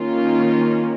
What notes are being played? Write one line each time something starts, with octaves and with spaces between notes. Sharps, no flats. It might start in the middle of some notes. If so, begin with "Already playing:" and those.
Already playing: D#3 A#3 C#4 F4